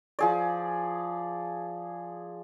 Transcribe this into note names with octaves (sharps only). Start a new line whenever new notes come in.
F3 G#4 D5